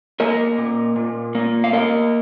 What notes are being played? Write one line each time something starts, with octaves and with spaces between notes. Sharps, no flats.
A#3 A#4 D#5
A#2
A#2
A#3
F5
A#3 A#4 D#5